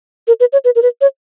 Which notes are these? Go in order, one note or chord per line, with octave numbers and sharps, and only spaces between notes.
A#4
B4
C#5
B4
A#4
B4
C#5